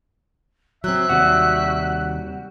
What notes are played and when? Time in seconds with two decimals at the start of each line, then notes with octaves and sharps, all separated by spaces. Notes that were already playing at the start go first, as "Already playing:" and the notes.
0.84 F#3 C4 E5 F#6
1.09 D#2 C3 G3 F#4